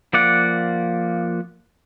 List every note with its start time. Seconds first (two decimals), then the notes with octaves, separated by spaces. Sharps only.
0.13 F3 A#3 D5 F#5